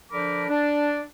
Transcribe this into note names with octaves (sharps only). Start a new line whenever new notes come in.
D3 F3 D4 A#4 B5 D6
D4